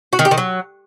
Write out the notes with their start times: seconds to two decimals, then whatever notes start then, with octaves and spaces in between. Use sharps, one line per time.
0.13 F#4
0.19 D#3
0.25 G4
0.31 D#3
0.38 F#3